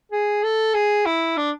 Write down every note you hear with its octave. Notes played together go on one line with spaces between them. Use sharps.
G#4
A4
G#4
E4
D4